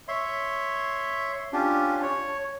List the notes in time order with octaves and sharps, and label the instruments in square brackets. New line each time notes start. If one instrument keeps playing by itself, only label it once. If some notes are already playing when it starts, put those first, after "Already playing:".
[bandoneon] C#5 E5 C6
C#4 D4 F4 G4
C#5